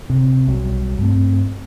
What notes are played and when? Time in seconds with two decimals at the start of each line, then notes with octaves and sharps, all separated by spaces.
0.10 C3
0.47 B1 F#3 G3
0.99 G2 A3 C4